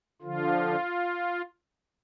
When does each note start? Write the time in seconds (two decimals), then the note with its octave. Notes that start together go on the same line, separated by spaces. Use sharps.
0.22 D3 F3 F4